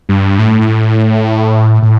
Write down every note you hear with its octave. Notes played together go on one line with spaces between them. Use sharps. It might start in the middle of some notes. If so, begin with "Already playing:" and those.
G2
A2
A2